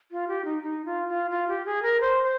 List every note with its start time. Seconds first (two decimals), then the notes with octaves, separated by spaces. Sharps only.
0.11 F4
0.28 G4
0.45 D#4
0.63 D#4
0.85 F4
1.08 F4
1.31 F4
1.48 G4
1.65 G#4
1.82 A#4
2.01 C5
2.23 C5